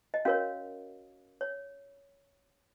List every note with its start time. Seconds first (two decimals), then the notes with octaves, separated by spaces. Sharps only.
0.14 D#5
0.25 C#4 F#4 A#4 C#5 F5
1.41 C#5